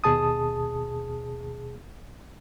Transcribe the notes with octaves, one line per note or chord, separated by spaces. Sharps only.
D#2 B2 G#4 A5 D#6